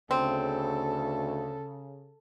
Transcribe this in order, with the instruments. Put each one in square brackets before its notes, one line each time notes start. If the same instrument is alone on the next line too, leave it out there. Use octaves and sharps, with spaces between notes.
[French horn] D2 [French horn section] C#3 [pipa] C4 [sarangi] A4